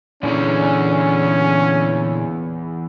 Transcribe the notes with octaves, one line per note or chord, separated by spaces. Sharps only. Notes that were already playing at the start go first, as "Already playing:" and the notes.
E2 A#2 D3 E3 C#4 G#4